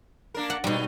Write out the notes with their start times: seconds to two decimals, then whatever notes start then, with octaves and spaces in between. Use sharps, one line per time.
0.34 A#3 D4 A#4
0.50 F#5
0.64 G2 B2 G3 D#4